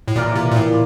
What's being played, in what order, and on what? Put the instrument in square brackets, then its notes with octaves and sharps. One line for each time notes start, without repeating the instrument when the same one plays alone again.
[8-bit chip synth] A2
[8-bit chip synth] A#2 [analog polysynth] E3 A#3 F4 A#4 D5
[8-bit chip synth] C3
A#2
A2